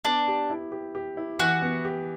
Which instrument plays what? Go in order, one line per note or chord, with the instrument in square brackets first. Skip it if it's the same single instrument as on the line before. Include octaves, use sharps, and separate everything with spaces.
[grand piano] B3 [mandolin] D4 D5
[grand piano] G4
E4
G4
G4
E4
[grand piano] E3 [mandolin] F#4 F#5
[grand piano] B3
G4